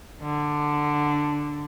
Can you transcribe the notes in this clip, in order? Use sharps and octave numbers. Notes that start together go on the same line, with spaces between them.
D3